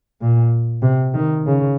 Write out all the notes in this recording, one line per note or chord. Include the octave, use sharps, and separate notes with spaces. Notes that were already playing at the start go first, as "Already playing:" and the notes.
A#2
C3
D#3
C#3